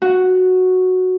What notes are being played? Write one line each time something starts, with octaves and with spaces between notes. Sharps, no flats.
F#4